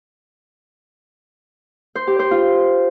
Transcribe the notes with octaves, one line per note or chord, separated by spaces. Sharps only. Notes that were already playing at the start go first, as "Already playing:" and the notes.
C5
G4
C5
F4